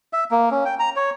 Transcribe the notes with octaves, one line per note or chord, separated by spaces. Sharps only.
E5
A#3
C#4
G5
A#5
C#5